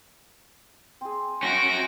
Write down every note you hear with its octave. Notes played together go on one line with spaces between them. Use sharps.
C4 G#4
C#4 F#4 C6 A#6 D7